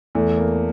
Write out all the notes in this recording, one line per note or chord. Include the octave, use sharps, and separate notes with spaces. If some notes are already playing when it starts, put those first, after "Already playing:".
E2 A3
A#3